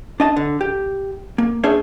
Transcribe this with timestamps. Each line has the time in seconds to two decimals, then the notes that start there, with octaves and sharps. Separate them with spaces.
0.20 D4 D#5 A5
0.37 D3
0.61 G4
1.38 A#3
1.64 D4 G#4 C5 C#5 E5